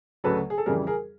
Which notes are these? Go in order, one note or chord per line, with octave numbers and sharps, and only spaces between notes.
D2 C#3 F#3 A4 B4
G#4
A4
F2 C#3 E3 G3 G#4 A#4
G#4 A#4